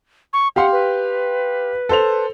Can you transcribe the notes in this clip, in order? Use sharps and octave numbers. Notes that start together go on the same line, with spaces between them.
C#6
G4 F5 F#5 C6
B4
A4 C5 F7